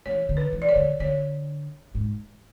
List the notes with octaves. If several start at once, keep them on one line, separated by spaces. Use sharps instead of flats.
E3 C#5
D3
B4
E3
D5
C#5
D3
D3 C#5
G#2